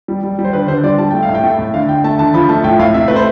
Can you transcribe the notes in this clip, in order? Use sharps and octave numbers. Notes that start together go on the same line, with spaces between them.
G3
G3
G3
C5
D3 B4
D3 C5
G3 D5
G3 A5
A3 G5
F5
A2
G5
A3
A2
D3 F5
D3 G5
A3 A5
D3 A5
F3 B5
A3 A5
A2 G5
A2 F5
C3 E5
A3 B4
C5